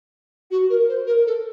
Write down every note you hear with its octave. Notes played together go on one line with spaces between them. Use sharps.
F#4
A#4
C5
A#4
A4